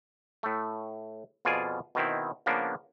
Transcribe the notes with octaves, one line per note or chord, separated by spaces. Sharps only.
A2 A3
F2 B2 F4 G#4 D5 G#5
B2 D#3 C4 E4
C#3 F3 A#3 B3 D4